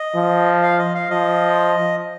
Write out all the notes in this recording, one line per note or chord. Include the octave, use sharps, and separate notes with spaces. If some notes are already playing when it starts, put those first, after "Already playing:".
Already playing: D#5
F3
F5
D#5
F5
F3 D#5